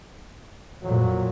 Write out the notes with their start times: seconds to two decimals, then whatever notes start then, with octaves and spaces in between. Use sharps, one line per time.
0.83 F2 A#2 F#3